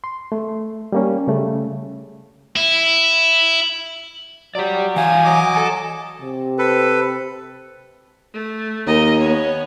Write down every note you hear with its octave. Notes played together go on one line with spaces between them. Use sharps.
C6
A3
G3 A#3 C#4
C#3 G3 A3
E4
F#3 G4 D5
E3 F5 G#5
F#3 D#5 D6
A4
C3
A4 B4
A3
D#2 A#4 D#5
B3 C#5